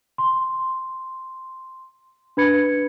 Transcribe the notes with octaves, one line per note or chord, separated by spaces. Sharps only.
C6
D4 B4 B5 G#6 C#7